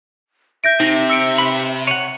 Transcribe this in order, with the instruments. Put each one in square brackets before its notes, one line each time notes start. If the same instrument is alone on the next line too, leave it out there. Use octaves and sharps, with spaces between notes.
[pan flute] E5 [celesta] G6 A#6 D7
[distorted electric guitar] C3 [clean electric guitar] C4 [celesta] D#4 A#6
[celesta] E6 C#7 D7
[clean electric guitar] C4 B4 B5
[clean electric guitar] C#5 F#5 [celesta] D#7